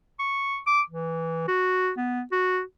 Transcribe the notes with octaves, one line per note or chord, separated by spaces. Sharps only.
C#6
D6
E3
F#4
B3
F#4